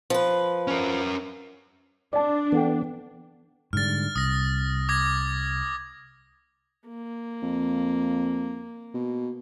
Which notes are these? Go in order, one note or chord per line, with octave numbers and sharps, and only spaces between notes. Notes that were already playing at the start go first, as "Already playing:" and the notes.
F3 B4
C#4 A#4
D4 D5 A5
E3 B3 A4 F#5 G5
G#2 D3 G3 F6 A6
C2 D#6 A#6
D6 G#6 A#6
A#3
F2
B2